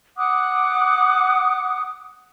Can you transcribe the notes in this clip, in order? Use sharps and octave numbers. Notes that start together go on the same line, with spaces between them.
F#5 D6 D#6 F#6